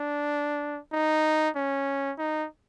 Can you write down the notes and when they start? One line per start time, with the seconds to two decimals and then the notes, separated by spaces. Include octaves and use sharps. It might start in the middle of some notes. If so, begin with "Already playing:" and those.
Already playing: D4
0.93 D#4
1.56 C#4
2.18 D#4